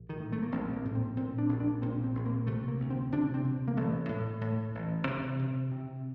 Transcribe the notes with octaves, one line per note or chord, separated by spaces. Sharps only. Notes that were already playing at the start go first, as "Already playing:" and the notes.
Already playing: A#1
D#3
A2
A3
A#3
A#1 C4
A#3
A2
C4
A#2 C4
D4
A#1
D4
A#2 C4
C4
A#1
A#3
C3 A3
A#3
D2
C4
C3 D4
C4
C3
A#3
A1 A3
A2
A2
A1
C3
C3
C3